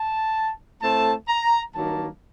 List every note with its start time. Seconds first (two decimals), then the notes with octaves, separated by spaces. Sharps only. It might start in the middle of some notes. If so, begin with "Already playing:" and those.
Already playing: A5
0.80 A2 A3 C4 A5
1.27 A#5
1.75 G2 D#3 F#3 A#3 A5